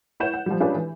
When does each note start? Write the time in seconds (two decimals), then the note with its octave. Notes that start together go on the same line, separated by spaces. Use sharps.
0.20 E4 B4 C#5 F#5 G6 E7
0.34 F#5
0.46 F3 G3
0.60 C#4 D4 F4 G4 G#4 B4
0.74 E3